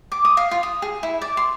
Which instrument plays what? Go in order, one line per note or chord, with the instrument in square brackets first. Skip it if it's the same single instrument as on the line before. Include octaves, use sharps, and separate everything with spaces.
[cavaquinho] D6
D#6
F5
F4
D#6
G#4
E4
D5
C6